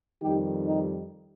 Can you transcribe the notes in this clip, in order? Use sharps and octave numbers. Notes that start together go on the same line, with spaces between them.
F2 D#3 G3 D#4 G4
D#4 G4